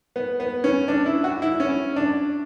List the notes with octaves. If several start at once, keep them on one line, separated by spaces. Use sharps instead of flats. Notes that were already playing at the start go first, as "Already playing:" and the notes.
B3
B3
C#4
D4
E4
F#4
E4
C#4
D4